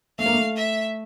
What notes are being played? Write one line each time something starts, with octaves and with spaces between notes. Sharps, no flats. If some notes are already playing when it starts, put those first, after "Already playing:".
A3 F5
A#3
A3
E5